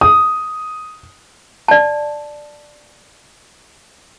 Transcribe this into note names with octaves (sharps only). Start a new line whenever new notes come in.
D#6
D5 A5